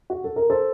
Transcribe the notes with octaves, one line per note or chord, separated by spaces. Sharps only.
F#4
A4
A#4
A4 C5